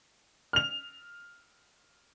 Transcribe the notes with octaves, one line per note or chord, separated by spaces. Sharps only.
F6 F7